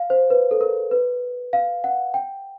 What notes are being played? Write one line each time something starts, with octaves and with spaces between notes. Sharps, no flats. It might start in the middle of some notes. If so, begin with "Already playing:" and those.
Already playing: F5
C5
B4
A4
A#4
B4
F5
F#5
G5